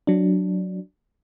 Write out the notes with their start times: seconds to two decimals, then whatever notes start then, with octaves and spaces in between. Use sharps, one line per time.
0.07 F#3 D4